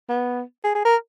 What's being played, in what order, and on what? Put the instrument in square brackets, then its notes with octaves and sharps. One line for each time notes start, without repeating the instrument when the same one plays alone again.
[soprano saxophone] B3
G#4
G#4
A#4